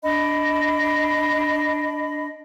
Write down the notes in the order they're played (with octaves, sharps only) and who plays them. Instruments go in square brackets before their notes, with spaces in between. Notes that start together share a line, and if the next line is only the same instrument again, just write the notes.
[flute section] D4 D#5 B5